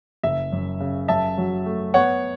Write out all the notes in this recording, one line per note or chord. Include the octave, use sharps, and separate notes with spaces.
F#1 E5
F#2
C#3
F#2 E5 A5
F#3
A3
B3 C#5 F#5